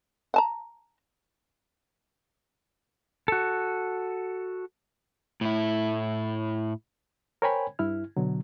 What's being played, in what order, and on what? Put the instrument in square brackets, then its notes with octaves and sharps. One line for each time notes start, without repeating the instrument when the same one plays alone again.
[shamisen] F#5 A5 A#5
[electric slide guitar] F#4 A4
[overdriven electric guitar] A2 E4
[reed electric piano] A#4 C5 C#5 G5 G#5 B5
G2 E4 F6
B2 D3 F#3